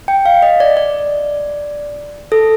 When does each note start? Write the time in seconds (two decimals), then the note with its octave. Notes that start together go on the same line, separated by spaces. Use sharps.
0.08 G5
0.26 F5
0.42 D#5
0.60 D5
0.77 D5
2.32 A4